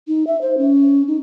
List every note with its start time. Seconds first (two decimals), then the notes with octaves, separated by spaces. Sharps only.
0.08 D#4
0.27 E5
0.41 C5
0.58 C#4
1.08 D#4